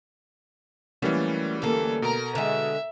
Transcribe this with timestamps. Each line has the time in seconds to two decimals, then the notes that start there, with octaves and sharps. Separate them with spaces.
1.02 E3 F#3 G3 A3 A#3 C#4
1.62 D2 A#3 A4
2.02 B2 A#4 A#5
2.35 D3 G#3 E5